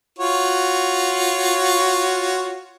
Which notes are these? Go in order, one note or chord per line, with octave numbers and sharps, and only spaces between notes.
F4 F#4 C#5